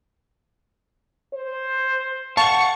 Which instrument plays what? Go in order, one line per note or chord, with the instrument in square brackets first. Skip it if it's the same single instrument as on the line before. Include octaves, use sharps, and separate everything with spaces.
[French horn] C5
[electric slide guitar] F5 F#5 [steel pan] A5 [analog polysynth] C#6